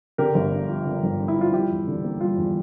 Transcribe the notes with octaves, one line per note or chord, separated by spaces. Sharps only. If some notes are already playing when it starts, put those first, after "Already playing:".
D3 G4 A#4
G1
G2
F3
D3
G1
G2
E4
F3 F4
G3 E4 G4
E2
D3
A#3
G3 F4
E2